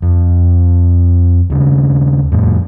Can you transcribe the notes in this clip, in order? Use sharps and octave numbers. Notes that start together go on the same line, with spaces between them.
F2
D#2 C#3
F2 A2